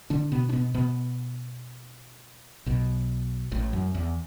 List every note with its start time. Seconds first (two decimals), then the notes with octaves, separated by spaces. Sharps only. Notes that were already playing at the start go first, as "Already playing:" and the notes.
0.10 D3 D4
0.32 B2 B3
0.49 D4
0.53 B2 B3
0.74 B2 B3
2.66 B1 B2
3.52 A1 A2
3.73 F#2
3.95 E2